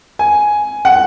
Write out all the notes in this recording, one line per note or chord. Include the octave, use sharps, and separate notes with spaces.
G#5
F#5